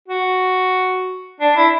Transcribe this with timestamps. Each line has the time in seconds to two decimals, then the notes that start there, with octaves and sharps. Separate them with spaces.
0.08 F#4
1.40 D4
1.56 E4